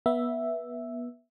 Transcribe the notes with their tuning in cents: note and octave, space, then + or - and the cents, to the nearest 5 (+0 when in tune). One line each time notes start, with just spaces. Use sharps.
B3 -25 E5 +0